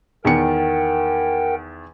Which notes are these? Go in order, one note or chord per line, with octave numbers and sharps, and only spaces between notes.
E2 D#3 A#4 F#5 G5 C#7